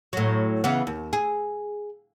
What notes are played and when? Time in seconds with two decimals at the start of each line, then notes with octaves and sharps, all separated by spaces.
0.13 A2 F#3
0.64 C#3 E3 B3
0.87 D#2
1.13 G#4